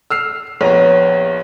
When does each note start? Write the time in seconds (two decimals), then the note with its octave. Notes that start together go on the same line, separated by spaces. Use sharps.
0.10 E6 F6 C7
0.61 A#1 B3 C#5 A#5